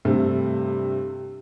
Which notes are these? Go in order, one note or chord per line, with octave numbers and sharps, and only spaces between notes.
G2 C3 A3